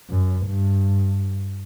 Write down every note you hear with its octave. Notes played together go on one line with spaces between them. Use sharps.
F#2
G2